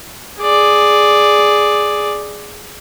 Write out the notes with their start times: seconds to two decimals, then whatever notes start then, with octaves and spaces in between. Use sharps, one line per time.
0.40 G#4 D5